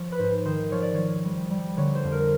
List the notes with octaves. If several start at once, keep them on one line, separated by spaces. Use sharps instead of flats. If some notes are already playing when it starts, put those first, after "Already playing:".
Already playing: F3 C#5
B4
G#2 C5
D#3 C5
F3 C#5
D5
F3 C#5
G3
G3
D3 C#5
C5
F2
A#4